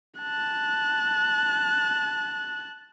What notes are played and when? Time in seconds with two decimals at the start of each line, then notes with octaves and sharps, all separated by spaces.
0.20 A5 F#6